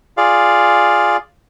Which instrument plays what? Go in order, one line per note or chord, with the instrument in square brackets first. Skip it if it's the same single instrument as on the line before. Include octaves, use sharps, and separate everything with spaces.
[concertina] F4 G#4 D5 F5